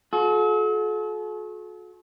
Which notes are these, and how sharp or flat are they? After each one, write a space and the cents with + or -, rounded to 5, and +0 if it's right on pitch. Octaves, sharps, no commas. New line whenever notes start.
F#4 -40 A4 -45